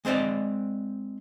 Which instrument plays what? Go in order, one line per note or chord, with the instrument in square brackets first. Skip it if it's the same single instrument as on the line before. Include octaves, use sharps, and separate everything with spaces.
[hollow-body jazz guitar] G#3 C4 C5 D5 D#5